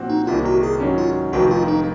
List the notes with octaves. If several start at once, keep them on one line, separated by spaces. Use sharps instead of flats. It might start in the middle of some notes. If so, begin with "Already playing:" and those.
Already playing: A#2 F3 C4 F#4
D#4
C2 C3 D#3 A#3 F4
F#4
G#4
G#2 D#3 F#3 C#4
F4
F1 F2 D#3 F#4
F4
D#4